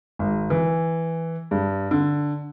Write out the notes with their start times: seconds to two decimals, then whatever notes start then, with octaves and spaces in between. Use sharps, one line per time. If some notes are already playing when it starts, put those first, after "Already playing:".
0.19 G#1
0.50 E3
1.51 G2
1.91 D3